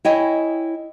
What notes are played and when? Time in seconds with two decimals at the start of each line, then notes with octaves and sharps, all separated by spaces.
0.05 E4 C#5 D#5 G5 G#5